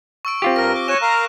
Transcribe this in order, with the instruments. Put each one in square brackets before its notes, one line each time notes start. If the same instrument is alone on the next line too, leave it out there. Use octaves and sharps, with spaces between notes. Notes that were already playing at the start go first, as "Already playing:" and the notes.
[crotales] C#6 E6 D7
[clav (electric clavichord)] C4 F4 G4
[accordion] G2 A#4 [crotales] F6 A#6
[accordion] D6
[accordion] C#5 G#5 [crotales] F#6 D#7 E7
[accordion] A#4 F5 A#5